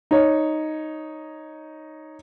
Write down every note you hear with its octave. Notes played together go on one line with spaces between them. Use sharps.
D#4 C#5